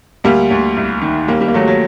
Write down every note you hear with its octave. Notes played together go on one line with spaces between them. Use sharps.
D2 G3 A#3
D2
C2
D#3
D#2 G3 A#3
G3
A#3
D#2 F#3 A3
F#3